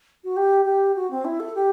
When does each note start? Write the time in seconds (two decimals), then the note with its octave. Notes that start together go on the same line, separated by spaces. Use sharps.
0.24 F#4
0.36 G4
0.65 G4
0.96 F#4
1.11 C4
1.25 E4
1.40 A4
1.55 G4